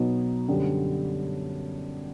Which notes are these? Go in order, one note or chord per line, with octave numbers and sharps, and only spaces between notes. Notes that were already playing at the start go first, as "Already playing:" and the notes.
Already playing: B2 F#3 B3 D#4 F#4
F#2 D3 G3 B3